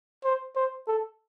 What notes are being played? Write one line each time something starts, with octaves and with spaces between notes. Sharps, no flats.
C5
C5
A4